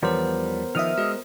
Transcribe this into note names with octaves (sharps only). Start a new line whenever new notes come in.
E2 E3 F3 G3 B3 A#4 C5 C#5
D#3 F3 D#4 E5 D#6 F6
G#3 F#4 D#5